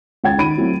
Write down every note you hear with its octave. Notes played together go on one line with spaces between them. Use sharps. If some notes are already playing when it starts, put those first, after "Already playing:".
C#2 G5 G#6 A6
D#3 B5 D7 D#7
F#3 A3 C4 E4